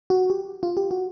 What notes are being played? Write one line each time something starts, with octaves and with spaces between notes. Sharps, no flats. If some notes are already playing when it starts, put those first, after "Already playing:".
F#4
G4
F4
G4
F#4